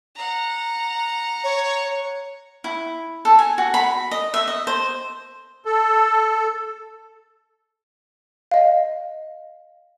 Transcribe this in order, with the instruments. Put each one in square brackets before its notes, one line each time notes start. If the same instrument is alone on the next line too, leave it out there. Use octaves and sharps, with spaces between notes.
[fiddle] F#5 A#5
[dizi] C#5
[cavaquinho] E4
A4
G#5
F#4
B5
D#5
E5
D#5
C5
[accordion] A4
[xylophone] D#5 F5